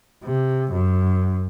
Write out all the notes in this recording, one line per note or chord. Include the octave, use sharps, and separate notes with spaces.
C3
F#2